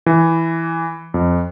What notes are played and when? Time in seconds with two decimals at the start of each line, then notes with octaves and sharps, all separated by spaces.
0.06 E3
1.14 F2